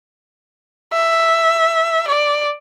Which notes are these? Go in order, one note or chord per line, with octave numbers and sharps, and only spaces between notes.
E5
D5